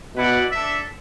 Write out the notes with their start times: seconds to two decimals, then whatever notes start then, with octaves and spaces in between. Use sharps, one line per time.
0.16 B2 E4 B4 D5 F#5
0.52 D4 A4 E5